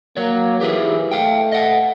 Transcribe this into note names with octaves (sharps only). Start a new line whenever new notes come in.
F#3 A#3 C#5
E3 G4 G#4 B4
A3 F5 G5
D#5 F#5